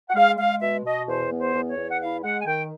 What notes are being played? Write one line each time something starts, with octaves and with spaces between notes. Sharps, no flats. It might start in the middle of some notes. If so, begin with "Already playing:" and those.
F#5
G#3 F5
G#3 F5
B2 E5
B2 D#5
E2 C5
B3
C5
E2
C#5
E2
F#5
E4 F5
G#3 F#5
G#5
D#3 G5